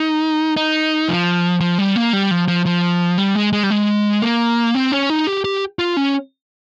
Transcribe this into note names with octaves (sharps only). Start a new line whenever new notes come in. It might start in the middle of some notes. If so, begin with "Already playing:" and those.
Already playing: D#4
D#4
F3
F3
G3
A#3
G3
F3
F3
F3
G3
G#3
G#3
G3
G#3
A#3
C4
C#4
D#4
G4
G4
F4
C#4